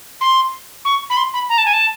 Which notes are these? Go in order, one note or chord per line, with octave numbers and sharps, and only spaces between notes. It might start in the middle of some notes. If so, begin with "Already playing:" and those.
C6
C#6
B5
C6
B5
A#5
A5
G#5
A5